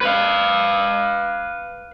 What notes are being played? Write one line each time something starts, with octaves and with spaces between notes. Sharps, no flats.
B4 F5